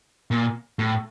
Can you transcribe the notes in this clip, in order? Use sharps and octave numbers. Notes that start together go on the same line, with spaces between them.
A#2
A2